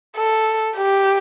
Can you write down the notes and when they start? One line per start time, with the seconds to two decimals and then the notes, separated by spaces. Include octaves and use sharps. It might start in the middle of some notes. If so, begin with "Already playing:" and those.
0.17 A4
0.76 G4